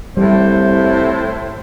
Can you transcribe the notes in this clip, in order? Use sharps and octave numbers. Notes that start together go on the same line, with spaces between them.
C2 A2 G3 C5